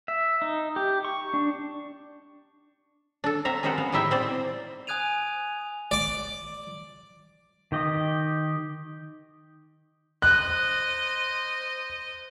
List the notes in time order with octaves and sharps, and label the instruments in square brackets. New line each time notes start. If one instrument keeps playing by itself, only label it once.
[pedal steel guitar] E5
D#4
G4
C#6
D4
[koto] D4 A4
C4 E5 F5 A#5
G#3 C#4 G4 A#4 C5 F#5
B3 F5
A2 G3 D#4 E4 E5 G5
C4 C5 D5
[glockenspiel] G#5 D#6 F#6 G#6 D#7 F7
[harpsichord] D5 D6
[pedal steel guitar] D#3 G4 D#5
[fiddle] C5 D#5 [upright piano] F#6